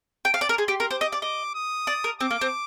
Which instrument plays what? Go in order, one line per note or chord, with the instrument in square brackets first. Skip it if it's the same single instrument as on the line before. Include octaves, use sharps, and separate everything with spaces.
[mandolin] G5
F5
D5
A#4
[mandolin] G#4 [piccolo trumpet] C6
[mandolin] G4
A#4
[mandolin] C5 [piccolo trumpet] D6
[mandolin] D#5
D5
[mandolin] D#5 [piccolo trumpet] D6
[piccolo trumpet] D#6
[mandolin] D5
A#4
[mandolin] C4 [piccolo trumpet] D6
[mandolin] A#3
C4